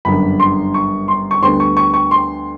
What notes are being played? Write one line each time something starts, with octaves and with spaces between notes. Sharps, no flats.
G1 F#2 D3 B5
C6
C#6
C6
C#6
D2 D3 G3 B3 C6
C#6
C#6
C#6
C6